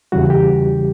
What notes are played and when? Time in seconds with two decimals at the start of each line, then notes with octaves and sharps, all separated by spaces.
0.12 E2 C#3 E3 G3 F#4
0.30 G4